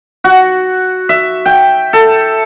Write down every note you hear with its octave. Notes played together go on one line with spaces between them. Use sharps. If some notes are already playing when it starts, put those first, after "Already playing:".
F#4
E5
G5
A4